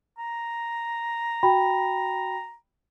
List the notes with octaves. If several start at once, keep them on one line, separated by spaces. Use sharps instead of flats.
A#5
F#4 G5 B5